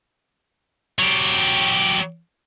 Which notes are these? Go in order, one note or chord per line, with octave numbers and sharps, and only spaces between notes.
F#3 G4